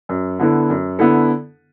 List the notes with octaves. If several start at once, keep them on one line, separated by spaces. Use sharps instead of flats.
F#2
D3 B3 E4 A4
F#2
D3 B3 E4 A4